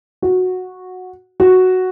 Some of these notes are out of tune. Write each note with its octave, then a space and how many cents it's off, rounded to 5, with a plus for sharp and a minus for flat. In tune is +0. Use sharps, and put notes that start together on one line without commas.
F#4 -10
F#4 +0